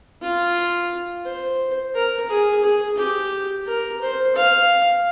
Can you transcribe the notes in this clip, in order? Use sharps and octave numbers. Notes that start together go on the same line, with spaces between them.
F4
C5
A#4
G#4
G#4
G4
A#4
C5
F5